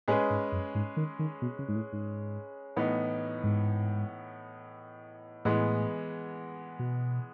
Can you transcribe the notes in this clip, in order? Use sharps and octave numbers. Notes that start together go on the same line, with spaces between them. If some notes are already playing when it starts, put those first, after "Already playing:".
A2 G#3 C#4 G#4 B4
G#2
F#2
G#2
D#3
D#3
B2
C#3
G#2
A2
G#2
A2 E3 B3 D#4
G#2
A2 E3 G#3 B3
B2